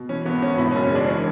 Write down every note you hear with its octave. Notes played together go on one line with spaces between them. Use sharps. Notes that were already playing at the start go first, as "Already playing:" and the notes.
Already playing: B2
E3 C#4
G#1 B3
G#1 C#4
B2 E4
C#4
F#1
C#4
G#3 D4
E3 C#4